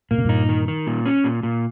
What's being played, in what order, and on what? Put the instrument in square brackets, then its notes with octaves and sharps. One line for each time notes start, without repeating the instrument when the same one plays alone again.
[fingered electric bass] A#2 [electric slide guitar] A#3
[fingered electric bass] C3
[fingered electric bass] G2 A#2 [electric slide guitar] D#4
[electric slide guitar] D#3
D#3
A#2
C#4
A#2
A#2